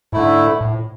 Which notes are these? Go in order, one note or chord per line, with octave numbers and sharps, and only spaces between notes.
G#2 D3 A3 E4
A2